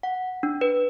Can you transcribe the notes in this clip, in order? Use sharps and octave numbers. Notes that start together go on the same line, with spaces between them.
F#5
D4
B4